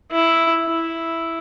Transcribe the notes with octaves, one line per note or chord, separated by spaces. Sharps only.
E4
E4